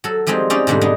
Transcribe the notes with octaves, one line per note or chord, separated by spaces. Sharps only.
F#3 A4
F3 G3 G#3 C4 D#4
C4 C#4 D#4 G4 D5 F5
G#2 B2 D3 G3 A#3
G#3 B3 D4 D#4